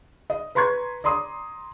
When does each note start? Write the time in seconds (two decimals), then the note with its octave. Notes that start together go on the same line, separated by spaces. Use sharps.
0.30 D#5
0.55 B4 A#5 C6 C#6 G#6
1.04 D5 A#5 C6 D#6